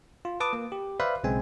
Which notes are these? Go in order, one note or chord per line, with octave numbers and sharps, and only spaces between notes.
F4
B4 A5 D6 D#6
A#3
G4
B4 C5 D5 E5 F5 B5
B1 C#3 G#3 C4 G#5